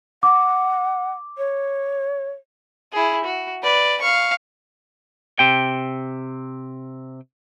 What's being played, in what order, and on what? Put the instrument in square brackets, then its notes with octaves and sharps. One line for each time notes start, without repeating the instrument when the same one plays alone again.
[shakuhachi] F#5 [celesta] D6
[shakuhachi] C#5
[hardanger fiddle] E4 G#4
F#4
B4 D5
F5 C#6
[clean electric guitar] C3 G5